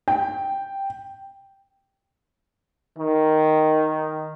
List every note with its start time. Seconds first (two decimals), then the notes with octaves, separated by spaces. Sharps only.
0.08 G5
2.97 D#3